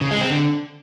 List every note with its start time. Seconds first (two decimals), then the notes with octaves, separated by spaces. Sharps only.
0.01 C#3
0.11 G#3
0.21 C4
0.30 D3